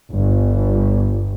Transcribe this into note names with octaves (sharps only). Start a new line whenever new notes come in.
G1